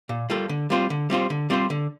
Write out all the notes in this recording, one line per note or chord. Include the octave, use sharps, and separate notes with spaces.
A#2
G3 A#3 F4 A4
D3
G3 C4 F4 C5
D3
G3 C4 F4 C5
D3
G3 C4 F4 C5
D3